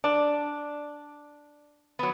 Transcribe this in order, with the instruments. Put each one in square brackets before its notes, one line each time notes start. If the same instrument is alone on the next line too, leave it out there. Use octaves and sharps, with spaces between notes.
[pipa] D4 [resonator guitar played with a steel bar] D5
[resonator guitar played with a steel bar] F#3 B3